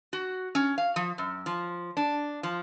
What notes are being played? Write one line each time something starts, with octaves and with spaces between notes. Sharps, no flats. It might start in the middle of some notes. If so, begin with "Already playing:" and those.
F#4
C#4
F5
F3
F#2
F3
D4
F3